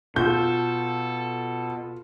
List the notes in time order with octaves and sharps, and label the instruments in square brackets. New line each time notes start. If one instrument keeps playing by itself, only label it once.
[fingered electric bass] B2 [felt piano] F4 [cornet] A4 [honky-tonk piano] G6